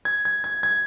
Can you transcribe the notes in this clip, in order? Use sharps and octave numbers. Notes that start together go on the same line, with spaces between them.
G#6
G#6
G#6
G#6